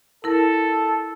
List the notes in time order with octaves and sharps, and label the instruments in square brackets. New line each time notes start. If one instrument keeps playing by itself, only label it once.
[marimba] E4 A#4 [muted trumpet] A4